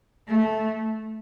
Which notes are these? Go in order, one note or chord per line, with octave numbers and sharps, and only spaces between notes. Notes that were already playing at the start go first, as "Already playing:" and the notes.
A3